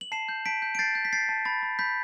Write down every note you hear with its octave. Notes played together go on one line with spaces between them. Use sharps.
F#7
A5 C7 E7
G6
A5 B6 D7
G6
D7
G6 A6 C7
G6
B6
G6 A6 C7
A5
B5 A6
B5
B5 G6 B6